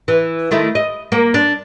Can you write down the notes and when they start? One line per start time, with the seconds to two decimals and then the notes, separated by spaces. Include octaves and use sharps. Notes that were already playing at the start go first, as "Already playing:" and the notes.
0.08 E3
0.51 D#3 A3 E4
0.75 D#5
1.12 A#3
1.34 D4